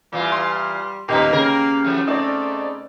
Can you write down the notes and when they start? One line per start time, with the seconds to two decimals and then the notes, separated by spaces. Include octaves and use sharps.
0.13 A#2 E3 G3 F4
0.32 C6
1.09 D#1 A2 A#3 D#4 G4 B4 A#5
1.33 C#3 C#4 A#4
1.85 E3 F#3 A3
2.08 A3 C4 D#4 D5